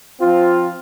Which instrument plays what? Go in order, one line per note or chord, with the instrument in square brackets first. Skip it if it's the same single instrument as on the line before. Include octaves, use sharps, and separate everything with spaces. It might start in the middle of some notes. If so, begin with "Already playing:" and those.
[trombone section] F3 C4 F4